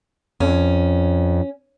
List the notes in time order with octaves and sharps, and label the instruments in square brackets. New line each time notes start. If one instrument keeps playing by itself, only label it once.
[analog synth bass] F2 [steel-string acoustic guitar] C#4